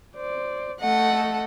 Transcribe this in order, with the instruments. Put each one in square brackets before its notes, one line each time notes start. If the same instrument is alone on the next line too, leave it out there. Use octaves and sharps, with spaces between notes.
[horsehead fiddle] C5 D5
[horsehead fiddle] A3 D#5 [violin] A4 F#5